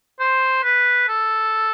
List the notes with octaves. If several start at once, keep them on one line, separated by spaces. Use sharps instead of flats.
C5
B4
A4